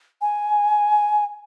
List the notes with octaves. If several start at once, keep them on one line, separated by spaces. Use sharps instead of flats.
G#5